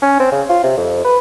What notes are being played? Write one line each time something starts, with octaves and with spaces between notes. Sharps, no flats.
C#4
C4
C#3
F4
C3
F2
B4